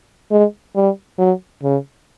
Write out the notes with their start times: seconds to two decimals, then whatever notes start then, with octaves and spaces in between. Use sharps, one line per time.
0.31 G#3
0.76 G3
1.18 F#3
1.63 C#3